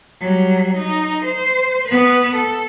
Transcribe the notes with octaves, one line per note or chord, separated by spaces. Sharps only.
F#3 G3
D#4
C5
B3 B4
A4